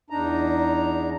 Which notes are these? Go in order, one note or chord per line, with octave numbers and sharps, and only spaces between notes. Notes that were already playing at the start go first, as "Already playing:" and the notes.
E2 D4 D#4 A#5